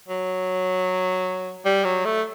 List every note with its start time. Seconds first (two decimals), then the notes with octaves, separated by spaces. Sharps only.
0.08 F#3
1.65 G3
1.84 F#3
2.05 A3